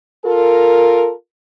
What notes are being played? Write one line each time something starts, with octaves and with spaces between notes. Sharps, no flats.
F4 A4 A#4